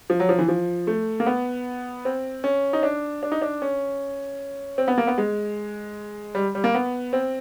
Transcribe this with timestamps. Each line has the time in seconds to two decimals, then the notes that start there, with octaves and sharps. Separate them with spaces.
0.10 F3
0.20 F#3
0.29 F3
0.39 E3
0.48 F3
0.87 A3
1.20 A#3
1.26 B3
2.05 C4
2.44 C#4
2.73 D#4
2.83 D4
3.23 D4
3.32 D#4
3.42 D4
3.62 C#4
4.78 C4
4.88 B3
4.98 A#3
5.07 B3
5.18 G#3
6.35 G3
6.55 G3
6.64 A#3
6.75 B3
7.13 C4